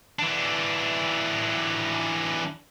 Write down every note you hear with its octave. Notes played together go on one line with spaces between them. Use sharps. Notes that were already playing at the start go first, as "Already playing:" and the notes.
E3 D4